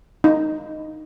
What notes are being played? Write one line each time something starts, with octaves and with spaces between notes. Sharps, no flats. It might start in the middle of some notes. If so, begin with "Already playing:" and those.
D#4